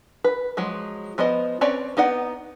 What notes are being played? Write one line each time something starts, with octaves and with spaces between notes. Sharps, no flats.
B4
F3 F#3 G#3
F3 B3 C5 D#5
C4 C#4 B4 C#5 D5
B3 D#4 D5 F#5